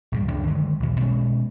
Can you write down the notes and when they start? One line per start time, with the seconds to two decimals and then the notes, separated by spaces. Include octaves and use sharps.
0.12 A#1 G2 D3
0.28 C#2 F#2 D4
0.47 D3 D#3 F#3 G#3
0.80 B1 E2
1.00 B2 G#3 C#4